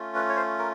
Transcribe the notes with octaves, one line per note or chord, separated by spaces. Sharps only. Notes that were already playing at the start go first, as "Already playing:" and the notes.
Already playing: A3 C#4 F4
B4
C#5
C5
A#4